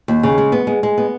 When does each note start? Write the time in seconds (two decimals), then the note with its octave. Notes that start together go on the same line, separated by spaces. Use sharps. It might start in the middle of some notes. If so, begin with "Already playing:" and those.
0.08 D#2
0.23 C#3
0.38 G#3
0.52 B3
0.67 G#3
0.83 G#3
0.98 B3